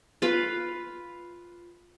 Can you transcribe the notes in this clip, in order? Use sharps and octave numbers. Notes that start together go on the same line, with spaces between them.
F4 B4 F5